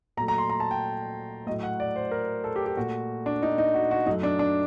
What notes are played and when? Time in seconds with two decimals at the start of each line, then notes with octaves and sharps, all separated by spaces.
0.17 A#2 F#3 A3 A#5
0.28 A#5
0.38 C6
0.50 A#5
0.60 A5
0.71 G5
1.47 A2 F#3 A3 D#5
1.63 F#5
1.80 D5
1.96 C5
2.11 A#4
2.44 A4
2.56 G4
2.66 G4
2.77 A#2 A3 F#4
3.26 D4
3.43 D#4
3.58 D#4
3.74 F#4
3.91 F#4
4.06 F#2 F#3 A3 D#4
4.23 D4
4.39 D4